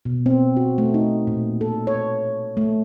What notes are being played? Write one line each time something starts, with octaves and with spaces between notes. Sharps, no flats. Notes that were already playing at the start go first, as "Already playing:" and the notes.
B2
C4
F#4
A3
D#4
A#2
A4
C#5
A3